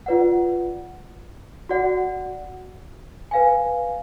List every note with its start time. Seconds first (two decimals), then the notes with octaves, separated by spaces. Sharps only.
0.06 F4 B4 D5 F#5
1.69 F#4 D5 F#5
3.31 B4 F5 G#5